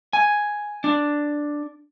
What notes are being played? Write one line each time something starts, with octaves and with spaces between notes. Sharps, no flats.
G#5
D4